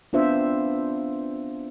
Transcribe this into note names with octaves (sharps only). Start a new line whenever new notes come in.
B3 C4 D4 F4 C5 E5